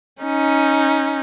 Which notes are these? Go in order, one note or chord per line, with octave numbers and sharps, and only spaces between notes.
C#4 D#4